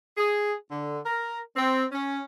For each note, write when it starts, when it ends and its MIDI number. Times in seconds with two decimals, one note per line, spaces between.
0.17 0.53 68
0.71 0.98 50
1.06 1.39 70
1.56 1.83 60
1.92 2.20 61